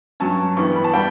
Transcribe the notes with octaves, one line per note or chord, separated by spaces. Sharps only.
G2 F#3 C#4 A5
G2 E3 G3 B3 C#6
B5
A5
G3 B3 D4 G5